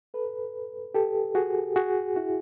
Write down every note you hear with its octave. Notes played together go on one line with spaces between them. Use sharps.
A4 B4
G4 A4
F#4 G#4
F#4 G#4
E4 F#4